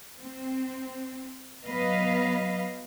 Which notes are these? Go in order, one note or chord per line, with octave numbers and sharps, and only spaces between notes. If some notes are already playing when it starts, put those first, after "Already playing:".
C4
F#3 B3 B4 D#5 F5